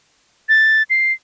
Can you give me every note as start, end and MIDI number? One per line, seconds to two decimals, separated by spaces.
0.49 0.83 93
0.90 1.13 96